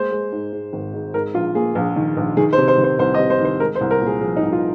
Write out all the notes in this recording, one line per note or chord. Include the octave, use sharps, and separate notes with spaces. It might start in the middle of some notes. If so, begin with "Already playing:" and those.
Already playing: G#3 A#3 C5
G#3
G#2
G#2
G#1
G#2
G#2 A#4
A#1 F4
A#3 G#4
A#1
D#3
A#1
D#3 G#4
C5
C3
C5
D#3
C5
C2 C5
D#5
C3
C5
D#3 C5
G#3 A#4
C5
C2
A#4
A#2
G#4
F3 G#4
D#4
C2
F4